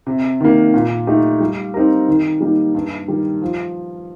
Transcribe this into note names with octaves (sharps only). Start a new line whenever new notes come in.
C3
D#3 A#3
A#2
A3 D#4 G4
G3
C4 D#4 G4 A#4
D#3
G3 A#3 D#4
G2
D#3 G3
F3